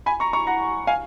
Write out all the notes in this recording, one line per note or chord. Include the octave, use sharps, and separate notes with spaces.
G#5 B5
A#5 C#6
A#5 C#6
F#5 A#5
F5 G#5